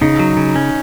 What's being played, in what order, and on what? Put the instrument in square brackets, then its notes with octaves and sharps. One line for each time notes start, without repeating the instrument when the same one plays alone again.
[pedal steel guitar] C#3 [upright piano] D#4
[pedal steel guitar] F#3
C#3
C#4